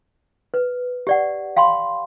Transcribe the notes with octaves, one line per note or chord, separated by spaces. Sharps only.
B4
G4 D5 F#5
F5 G5 B5 C6